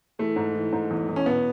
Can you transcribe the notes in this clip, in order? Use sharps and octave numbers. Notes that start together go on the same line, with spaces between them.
E3 A3
G#2
E3
G#2
E2
E2
C#4
B2 B3